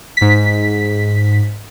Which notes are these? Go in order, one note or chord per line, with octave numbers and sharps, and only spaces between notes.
G#2 B6